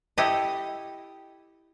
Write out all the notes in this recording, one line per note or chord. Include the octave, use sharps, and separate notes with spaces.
E4 G4 A4 D#5